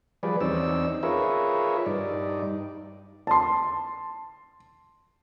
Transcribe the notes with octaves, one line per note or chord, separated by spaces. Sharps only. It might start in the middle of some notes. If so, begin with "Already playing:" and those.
F3 G3 G#4 B4 D5
E2 C4 C#4 D#4 D5 E6
F4 G#4 A#4 B4 C#5 E5
G2 D#4 D5
A5 C6